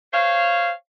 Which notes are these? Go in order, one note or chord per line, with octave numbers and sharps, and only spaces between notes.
C5 C#5 F5